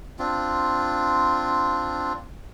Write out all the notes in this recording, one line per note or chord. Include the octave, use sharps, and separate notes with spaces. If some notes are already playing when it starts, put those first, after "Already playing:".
C4 D4 F4